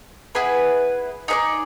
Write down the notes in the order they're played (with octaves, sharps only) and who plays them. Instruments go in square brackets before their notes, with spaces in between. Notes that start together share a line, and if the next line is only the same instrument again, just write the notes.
[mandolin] B3 E4 G#4 B4
D#4 G#4 B4 D5